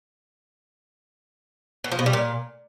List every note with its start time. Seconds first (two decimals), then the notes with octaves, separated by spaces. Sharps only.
1.84 B2
1.92 F3
1.99 B2
2.06 G3
2.13 A#2